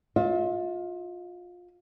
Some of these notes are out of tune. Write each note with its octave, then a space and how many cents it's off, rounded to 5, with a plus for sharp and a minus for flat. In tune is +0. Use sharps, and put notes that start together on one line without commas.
F4 +25 E5 -35